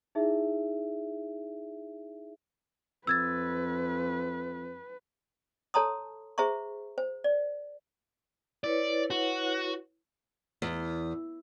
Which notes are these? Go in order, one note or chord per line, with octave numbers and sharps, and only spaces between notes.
D#4 E4 G#4 E5
F2 B4 E6 G#6 A6
A4 C#5 A5 A#5 C6 D#6
G#4 C5 E5 A#5 C#6
C5
D5
E4 B4 C#5 D5
F#4
E2